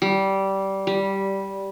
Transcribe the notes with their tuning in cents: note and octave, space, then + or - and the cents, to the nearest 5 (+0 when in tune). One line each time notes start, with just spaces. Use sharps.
G3 -15
G3 -5